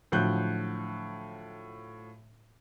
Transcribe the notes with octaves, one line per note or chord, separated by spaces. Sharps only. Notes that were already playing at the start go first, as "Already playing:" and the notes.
A2 D3 F3 F#3 F#6 G6